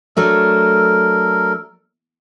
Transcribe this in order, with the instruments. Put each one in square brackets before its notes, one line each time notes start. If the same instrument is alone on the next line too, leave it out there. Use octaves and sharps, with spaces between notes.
[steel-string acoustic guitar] F#3 A3 D4 [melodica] A4 A#4